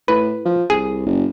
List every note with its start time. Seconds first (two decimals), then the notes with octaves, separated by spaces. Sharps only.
0.08 A2 B4
0.45 F3
0.70 C2 G#4
1.06 F#1